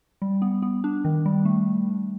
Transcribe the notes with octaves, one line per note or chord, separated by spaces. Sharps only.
G3
B3
B3
D4
D#3
G3
A3